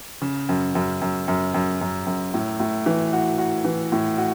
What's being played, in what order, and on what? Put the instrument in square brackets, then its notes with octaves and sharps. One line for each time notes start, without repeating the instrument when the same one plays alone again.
[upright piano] C#3
F#2
F#2
F#2
F#2
F#2
F#2
F#2
A2
A2
E3
F#4
F#4
E3
A2
F#4